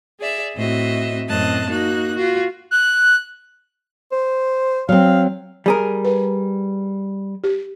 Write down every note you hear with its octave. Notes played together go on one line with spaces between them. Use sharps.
G#4 D5 E5
A2 C4 F#4 D#5 E5
F#2 A2 C4 D#5 A5 F#6
A#3 D#4 F#4 F#6
F4 F#4
F#6
C5
F#3 C4 F5
G3 G#4 A#4
B4
G4